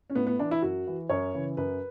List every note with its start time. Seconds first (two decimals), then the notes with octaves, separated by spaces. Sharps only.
0.10 C#4
0.15 A2 B3
0.27 B3
0.39 E3 D4
0.51 E4
0.62 F#2 F#4
0.87 E3
1.09 F#2 C#5
1.34 C#3 E3
1.57 F#2 B4